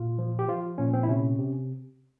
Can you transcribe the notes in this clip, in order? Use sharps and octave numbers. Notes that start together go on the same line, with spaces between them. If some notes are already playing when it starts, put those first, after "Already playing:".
Already playing: A#2 F4
F3
G4
F3 F4
A#2 C#4
C4
E4
C3 C#4
C3